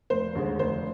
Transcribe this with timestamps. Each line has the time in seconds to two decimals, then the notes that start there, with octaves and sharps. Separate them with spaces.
0.10 F1 C5
0.35 D#2 D3 G#3
0.59 F1 C5